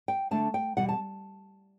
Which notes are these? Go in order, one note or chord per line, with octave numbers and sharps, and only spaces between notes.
G5
D3 A3 D4 A5
G5
E2 B2 G3 F#5
A5